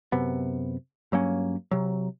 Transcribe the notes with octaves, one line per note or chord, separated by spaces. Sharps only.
F#2 C3 B3
G2 F#3 A#3 C#4
C3 F#3